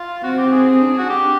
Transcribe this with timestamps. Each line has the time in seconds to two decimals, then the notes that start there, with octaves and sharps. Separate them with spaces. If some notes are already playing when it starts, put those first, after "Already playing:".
Already playing: F4
0.23 C4 F#4
0.38 G4
0.52 G#4
0.81 D4
0.98 F#4
1.10 G4